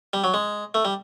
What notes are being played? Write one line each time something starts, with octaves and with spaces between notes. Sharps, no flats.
G3
F#3
G#3
A3
G3